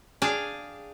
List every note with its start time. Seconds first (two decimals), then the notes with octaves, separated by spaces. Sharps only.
0.22 D4 G#4 F5 G5